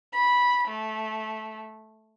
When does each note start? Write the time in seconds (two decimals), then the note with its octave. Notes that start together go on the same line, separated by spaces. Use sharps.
0.13 B5
0.68 A3